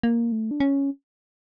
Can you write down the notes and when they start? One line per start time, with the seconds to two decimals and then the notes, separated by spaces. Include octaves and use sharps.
0.03 A#3
0.32 A3
0.51 D4
0.60 C#4